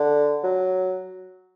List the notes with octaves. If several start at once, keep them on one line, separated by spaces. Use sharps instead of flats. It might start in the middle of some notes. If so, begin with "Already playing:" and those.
Already playing: D3
F#3